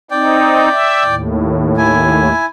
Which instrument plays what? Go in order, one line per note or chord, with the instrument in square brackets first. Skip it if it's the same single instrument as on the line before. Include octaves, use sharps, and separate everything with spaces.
[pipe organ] C4 D#4 [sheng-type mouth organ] D5 G5
[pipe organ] E5
D#2 A2
[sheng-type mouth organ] E4 G#5